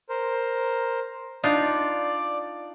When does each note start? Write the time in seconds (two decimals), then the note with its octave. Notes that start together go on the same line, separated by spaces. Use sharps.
0.09 A#4 C5
1.44 D4 D#4 F4 D5